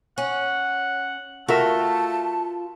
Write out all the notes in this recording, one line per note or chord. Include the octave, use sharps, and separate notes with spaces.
C#4 F#5
A3 F4 F#4 A#4 E5 A5